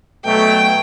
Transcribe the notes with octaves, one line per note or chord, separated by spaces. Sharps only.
B2 F#3 A3 G5